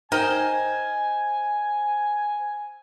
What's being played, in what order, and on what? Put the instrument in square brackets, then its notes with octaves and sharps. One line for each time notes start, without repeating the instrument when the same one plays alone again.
[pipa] D#4 A#4 G5 [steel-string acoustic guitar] C5 D#5 [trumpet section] G#5